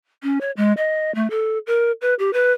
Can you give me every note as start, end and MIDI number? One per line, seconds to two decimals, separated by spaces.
0.23 0.41 61
0.41 0.51 73
0.57 0.73 56
0.77 1.13 75
1.15 1.30 57
1.30 1.58 69
1.67 1.92 70
2.01 2.14 71
2.19 2.32 67
2.33 2.52 71